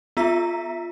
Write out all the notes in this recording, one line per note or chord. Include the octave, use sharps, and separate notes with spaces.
B3 F4 E5 A#5 B6